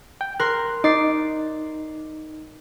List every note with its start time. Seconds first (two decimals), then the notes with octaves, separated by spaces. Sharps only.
0.21 G5
0.40 A#4 C6 F#6
0.84 D#4 D5 C7